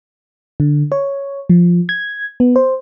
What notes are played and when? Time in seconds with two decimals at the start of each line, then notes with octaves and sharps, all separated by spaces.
0.60 D3
0.92 C#5
1.50 F3
1.89 G#6
2.40 B3
2.56 C5